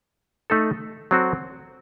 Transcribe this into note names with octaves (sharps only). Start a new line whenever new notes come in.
A3 D#4 A4
F#3 C4 F#4 A4